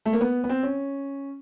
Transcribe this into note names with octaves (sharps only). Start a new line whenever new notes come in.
A3
A#3
B3
B3
C4
C#4